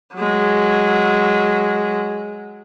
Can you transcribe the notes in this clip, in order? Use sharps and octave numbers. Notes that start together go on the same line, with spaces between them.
F#3 G#3